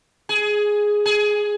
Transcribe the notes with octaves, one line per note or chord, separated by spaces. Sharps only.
G#4
G#4